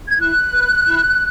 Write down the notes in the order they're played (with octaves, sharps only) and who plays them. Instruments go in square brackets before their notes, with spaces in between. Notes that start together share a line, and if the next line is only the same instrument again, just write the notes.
[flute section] G#6
E4 F#6
B4
E4